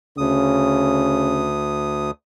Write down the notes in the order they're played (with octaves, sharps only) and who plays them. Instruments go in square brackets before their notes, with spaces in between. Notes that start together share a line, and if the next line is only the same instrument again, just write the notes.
[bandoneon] D2 D#6 [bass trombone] C#3